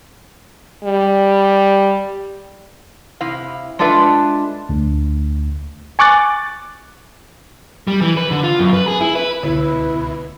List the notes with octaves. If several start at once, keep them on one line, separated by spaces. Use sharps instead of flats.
G3
C3 E4 F5
G#3 D4 F4 A4 B4 E5
D2
G#5 C#6 D6 F#6 A6
G3
E3
B4
D3
F4
F#2
B4
G#4
E4
B4
C#2 B2 D3 E4 B4